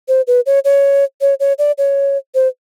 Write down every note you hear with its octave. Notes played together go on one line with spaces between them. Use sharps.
C5
B4
C#5
C#5
C#5
C#5
D5
C#5
C5